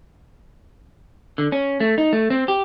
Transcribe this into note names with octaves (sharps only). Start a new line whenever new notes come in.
D3
C#4
A3
D#4
A3
C4
G4